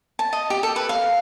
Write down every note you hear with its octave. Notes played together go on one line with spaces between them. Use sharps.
A5
D#5
G4
A4
B4
F5